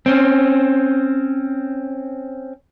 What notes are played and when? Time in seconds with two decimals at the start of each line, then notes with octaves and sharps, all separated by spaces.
0.06 C4 C#4